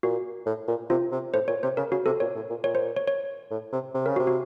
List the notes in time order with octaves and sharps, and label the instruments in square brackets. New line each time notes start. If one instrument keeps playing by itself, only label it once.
[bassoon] A#2 [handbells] F#4
[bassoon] A2
A#2
[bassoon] C3 [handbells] F4
[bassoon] C3
[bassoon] A2 [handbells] C5
[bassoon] A#2 [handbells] C#5
[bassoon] C3 [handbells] C5
[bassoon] C#3 [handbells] A#4
[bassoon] C#3 [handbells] F#4
[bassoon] C3 [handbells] A4
[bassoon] A#2 [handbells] C#5
[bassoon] A2
A#2
[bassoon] A#2 [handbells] C#5
[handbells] C5
C#5
C#5
[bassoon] A2
C3
C3
[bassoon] C#3 [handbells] A#4
[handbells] F#4
[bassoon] C3
[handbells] F#4